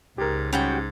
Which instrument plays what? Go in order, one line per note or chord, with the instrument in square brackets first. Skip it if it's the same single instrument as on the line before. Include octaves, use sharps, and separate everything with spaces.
[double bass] C#2 [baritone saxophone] G#2 [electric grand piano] G4 A#4
[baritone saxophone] G#2 [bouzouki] G3 F#4 G5 [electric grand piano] C#4